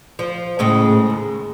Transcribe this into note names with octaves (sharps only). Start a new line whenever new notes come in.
F3
A2 C#3 G#3
D#2